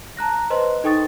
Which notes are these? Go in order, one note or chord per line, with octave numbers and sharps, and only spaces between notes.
A5 A#5 F#6 A#6
B4 C5 D#5 C6
D#4 A4 G5 C#6 D#6 A6